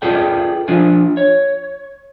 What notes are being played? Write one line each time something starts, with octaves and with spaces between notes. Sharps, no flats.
F4 G#4 A4 B4 D5 G5
F3 D4 F4 G#5
C#5